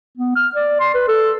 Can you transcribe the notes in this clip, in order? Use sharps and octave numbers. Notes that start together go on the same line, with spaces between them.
B3
F6
D5
C6
B4
A4